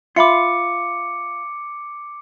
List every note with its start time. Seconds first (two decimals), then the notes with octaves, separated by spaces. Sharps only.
0.16 F4 E5 B5 D6 C#7